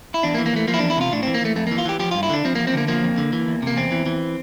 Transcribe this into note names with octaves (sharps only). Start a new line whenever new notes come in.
E4
E2 D4
A#3
E3
A#3
E3 A3
F3 A#3
E4
E2 D4
E4
C3 F4
A2 D4
E3 C4
A#3
E3 A3
F2 A3
E3 A#3
F4
E3 G4
F3 G4
G2 F4
E4
D3 D4
F3 C4
E2 A#3
C4
D3 A#3
F3 A#3
F2
D3
E3
E2
C3 A#3
E2 C4
E3
E3